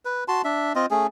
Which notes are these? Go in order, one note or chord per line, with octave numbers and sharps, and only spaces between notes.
B4
F#4 A5 C6
D4 E5
C4 F4 D#5
A3 C#4 G#4